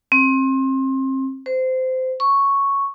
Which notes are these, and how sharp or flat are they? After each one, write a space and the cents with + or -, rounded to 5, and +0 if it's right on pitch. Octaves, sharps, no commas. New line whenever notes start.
C4 +30
C5 -20
C#6 +0